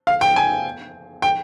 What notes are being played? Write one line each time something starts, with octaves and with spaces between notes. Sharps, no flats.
F5
G5
G#5
G5